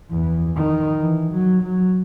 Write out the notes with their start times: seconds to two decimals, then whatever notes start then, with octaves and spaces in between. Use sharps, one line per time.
0.11 E2
0.56 D#3
1.01 E3
1.32 F#3
1.63 F#3